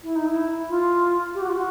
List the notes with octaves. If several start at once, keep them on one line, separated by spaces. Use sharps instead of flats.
E4
D#4
E4
F4
G4
F#4
F4
F#4